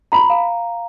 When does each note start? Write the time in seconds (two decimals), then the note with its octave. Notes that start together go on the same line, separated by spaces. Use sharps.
0.12 A#5 B5
0.30 F5